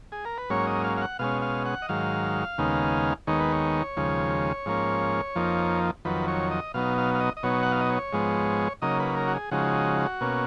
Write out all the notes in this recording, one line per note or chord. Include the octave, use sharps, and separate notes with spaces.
G#4
A#4
B4
G#2 F#3 A#3 C#4 C#5
D#5
F5
F5
F#5
B2 G#3 C#4 F5
F5
F#5
D#5
G#2 D#3 F#3 F5
D#2 C#3 G#3 B3 D#4
D#2 D#3 G#3 B3 D#4 C#5
B4
C#5
D#2 C#3 F3 G#3
G#2 F3 A#3 C#4
F2 F3 A#3 D#4
F2 D#3 F#3 B4
C#5
D#5
B2 F#3 B3 D#4 F5
F5
F5
D#5
D#5
B2 F#3 B3 D#4 C#5
F#5
F5
D#5
C#5
G#2 F3 G#3 B3
C#3 F#3 A#3 D#4 D#5
B4
A#4
F#4
G#4
C#3 F3 G#3 D#4 F#4
B2 A#3 C#4